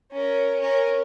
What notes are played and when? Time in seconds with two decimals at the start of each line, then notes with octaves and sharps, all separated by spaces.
0.11 C#4 A#4
0.60 C#4 A#4